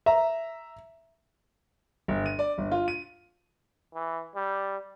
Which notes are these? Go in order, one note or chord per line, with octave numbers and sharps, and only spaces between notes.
E5 A#5
G1
D#7
D5
G1
F4
D#7
E3
G3